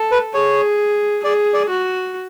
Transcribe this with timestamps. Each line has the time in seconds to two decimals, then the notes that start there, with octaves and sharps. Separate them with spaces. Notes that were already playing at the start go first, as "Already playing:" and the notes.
Already playing: A4
0.11 B4
0.33 G#4 C#5
1.24 G#4 D5
1.54 D5
1.69 F#4